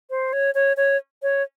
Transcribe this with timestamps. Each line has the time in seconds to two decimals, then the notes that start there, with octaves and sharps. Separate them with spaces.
0.10 C5
0.33 C#5
0.55 C#5
0.77 C#5
1.23 C#5